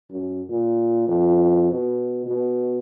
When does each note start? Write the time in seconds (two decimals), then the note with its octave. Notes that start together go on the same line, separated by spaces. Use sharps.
0.11 F#2
0.49 A#2
1.08 F2
1.72 B2
2.26 B2